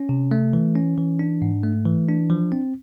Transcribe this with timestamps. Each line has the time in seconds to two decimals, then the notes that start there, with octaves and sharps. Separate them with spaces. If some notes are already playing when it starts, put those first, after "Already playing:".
Already playing: C#4
0.09 C3
0.31 A3
0.53 E3
0.75 C#4
0.98 E3
1.19 D4
1.42 G#2
1.64 A3
1.86 E3
2.09 D4
2.30 F3
2.52 C4